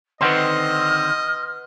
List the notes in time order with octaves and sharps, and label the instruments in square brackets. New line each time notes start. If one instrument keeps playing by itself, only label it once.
[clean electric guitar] D3 D#3 C4 [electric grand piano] B4 F#5 C6 [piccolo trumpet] D#5 [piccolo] F6